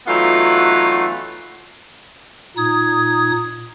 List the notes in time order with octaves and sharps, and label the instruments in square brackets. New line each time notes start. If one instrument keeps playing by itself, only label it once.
[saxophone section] E3 F#3 A3 B3 D#4 F4
[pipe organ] A#2 D#4 D#6 G#6